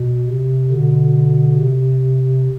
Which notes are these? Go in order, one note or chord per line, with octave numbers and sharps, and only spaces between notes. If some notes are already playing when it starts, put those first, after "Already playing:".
Already playing: B2
C3
B2 D3
C3